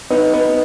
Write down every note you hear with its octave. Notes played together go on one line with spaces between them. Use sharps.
B3 D#4
B3